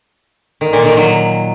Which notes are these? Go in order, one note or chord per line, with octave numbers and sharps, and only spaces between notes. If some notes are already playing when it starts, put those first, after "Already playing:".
D#3
A#2
D#3
F#3